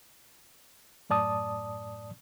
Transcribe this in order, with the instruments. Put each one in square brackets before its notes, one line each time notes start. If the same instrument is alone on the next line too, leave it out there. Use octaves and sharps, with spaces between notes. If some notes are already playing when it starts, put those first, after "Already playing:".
[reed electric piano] F#2 A2 D5 A5 D#6